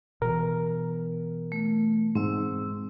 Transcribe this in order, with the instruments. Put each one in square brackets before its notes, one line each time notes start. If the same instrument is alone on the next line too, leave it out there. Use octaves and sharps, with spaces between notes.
[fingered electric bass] B2 E3 [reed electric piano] A#4
[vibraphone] A3
[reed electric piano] G#2 [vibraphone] C4 E6